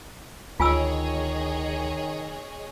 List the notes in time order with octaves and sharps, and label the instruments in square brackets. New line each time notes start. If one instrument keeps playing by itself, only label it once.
[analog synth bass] D2 [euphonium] D#3 [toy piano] F4 G#5 E6 [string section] G#4 C#5 D#5